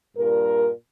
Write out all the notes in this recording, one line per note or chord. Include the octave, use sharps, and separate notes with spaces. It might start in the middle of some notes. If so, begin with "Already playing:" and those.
G2 A#2 A#4